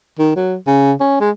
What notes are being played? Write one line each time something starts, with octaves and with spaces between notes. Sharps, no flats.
D#3
F#3
C#3
C#4
G#3